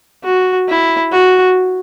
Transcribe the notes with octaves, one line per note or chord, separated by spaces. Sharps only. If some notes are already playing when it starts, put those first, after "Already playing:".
F#4
E4
F#4